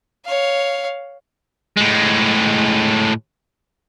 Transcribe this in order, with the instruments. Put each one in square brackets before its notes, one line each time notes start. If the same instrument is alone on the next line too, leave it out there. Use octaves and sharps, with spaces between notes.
[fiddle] C#5 F5
[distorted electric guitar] A2 G#3